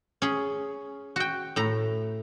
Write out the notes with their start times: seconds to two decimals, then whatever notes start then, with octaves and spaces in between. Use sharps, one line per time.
0.22 C#4 G#4
1.16 F#4 G5
1.56 A2 A#5